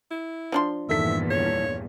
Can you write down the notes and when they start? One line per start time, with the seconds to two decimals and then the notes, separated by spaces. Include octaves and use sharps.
0.11 E4
0.52 F3 D4 C6
0.89 E2 G2 A#2 D#3 A4 E5 B6
1.30 C#5